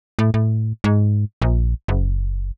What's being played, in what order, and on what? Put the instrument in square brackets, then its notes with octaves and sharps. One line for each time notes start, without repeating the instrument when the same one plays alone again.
[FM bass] A2
A2
G#2
A#1
F#1